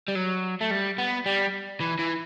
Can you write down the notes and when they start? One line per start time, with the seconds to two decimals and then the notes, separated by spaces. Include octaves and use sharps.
0.09 G3
0.16 F#3
0.61 A3
0.71 G3
0.98 B3
1.26 G3
1.80 E3
1.99 E3